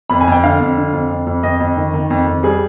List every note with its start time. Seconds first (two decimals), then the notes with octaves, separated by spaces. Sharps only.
0.10 F2 B5
0.21 G#5
0.28 F2 G5
0.43 D3 F5
0.61 F2
0.77 D3
0.93 F2
1.11 F2
1.27 F2
1.43 F2 D#5
1.60 F2
1.77 D#3
1.94 D#3
2.11 F2
2.27 F2
2.43 G3 G#4